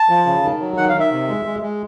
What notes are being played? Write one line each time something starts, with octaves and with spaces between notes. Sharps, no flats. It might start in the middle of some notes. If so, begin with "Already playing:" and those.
Already playing: A5
F3
C#3
D#3
F#3
D#3 F#5
F5
D#3
E5
C3
G#3
G#3
G#3